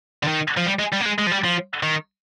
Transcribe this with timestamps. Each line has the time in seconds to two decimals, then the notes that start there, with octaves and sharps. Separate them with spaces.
0.23 D3
0.27 D#3
0.57 F3
0.66 G3
0.79 G#3
0.92 G3
1.01 A#3
1.05 G#3
1.18 G#3
1.27 F3
1.31 G3
1.44 F3
1.83 D#3